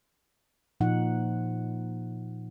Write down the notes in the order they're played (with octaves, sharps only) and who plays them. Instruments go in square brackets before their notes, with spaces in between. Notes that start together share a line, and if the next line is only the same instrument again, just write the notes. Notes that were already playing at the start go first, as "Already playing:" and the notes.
[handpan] A#2 F3 D#4 F#5